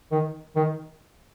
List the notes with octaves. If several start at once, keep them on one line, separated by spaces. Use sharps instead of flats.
D#3
D#3